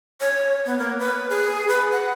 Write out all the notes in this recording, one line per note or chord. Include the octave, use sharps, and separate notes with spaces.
C#5
B3
A#3
B4
G#4
B4
F#5